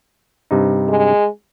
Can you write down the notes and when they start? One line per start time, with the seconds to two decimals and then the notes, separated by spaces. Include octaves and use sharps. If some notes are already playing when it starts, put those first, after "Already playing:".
0.51 G2 C3 D#4
0.89 G#3